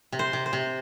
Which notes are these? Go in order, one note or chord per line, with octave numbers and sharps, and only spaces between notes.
C3
C5
C3
C5
C3